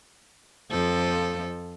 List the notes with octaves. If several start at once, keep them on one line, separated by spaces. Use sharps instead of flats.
F2 F3 A4